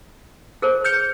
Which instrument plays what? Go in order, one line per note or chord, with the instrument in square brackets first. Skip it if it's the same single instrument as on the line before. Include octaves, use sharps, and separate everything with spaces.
[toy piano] G#4 A#4 C5
[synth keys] F6 G6 C#7